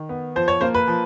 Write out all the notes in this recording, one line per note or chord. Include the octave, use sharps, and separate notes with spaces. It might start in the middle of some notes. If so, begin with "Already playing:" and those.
Already playing: D#3
B3
F3 C5
C#5
A#3 C5
B4
F3